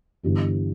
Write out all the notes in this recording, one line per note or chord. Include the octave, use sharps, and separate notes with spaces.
G1 G2 E3 G3 E4